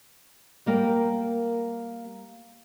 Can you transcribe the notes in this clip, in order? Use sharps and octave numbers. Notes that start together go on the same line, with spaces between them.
G3 A#3 A#4 G5